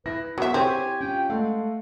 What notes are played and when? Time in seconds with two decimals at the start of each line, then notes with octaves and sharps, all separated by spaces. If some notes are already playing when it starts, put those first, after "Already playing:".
0.06 E4 B4 A#6
0.38 F#3 B3 F#4 E5
0.54 C4 E4 G4 C5 C#5 G#5
1.01 C#4 F4 G5
1.30 G#3 A3 F5 F#5